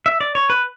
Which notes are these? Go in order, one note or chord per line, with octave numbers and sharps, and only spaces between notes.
E5
D5
C#5
B4